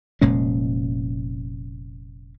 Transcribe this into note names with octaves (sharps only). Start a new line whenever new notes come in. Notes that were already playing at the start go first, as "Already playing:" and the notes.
F1 A#2 G#3 C#4